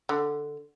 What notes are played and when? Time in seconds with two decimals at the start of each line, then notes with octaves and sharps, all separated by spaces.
0.09 D3